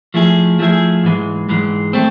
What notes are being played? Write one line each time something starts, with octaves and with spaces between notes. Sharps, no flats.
F3 A3 E4 G#4
F3 A3 E4 G#4
G#2 E3 G#3
G#2 E3 G#3
A3 C4